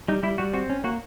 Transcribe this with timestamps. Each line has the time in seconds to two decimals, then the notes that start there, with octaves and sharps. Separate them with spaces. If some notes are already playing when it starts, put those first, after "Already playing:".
0.08 G3 D#4
0.23 G3 E4
0.38 G3 F#4
0.53 C4 F#4
0.70 C#4
0.84 A#3 F#4